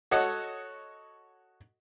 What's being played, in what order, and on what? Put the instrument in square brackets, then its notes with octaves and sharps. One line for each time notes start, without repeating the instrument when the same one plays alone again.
[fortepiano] F#4 A4 C#5 D#5 F#5